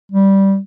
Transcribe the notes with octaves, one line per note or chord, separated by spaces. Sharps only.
G3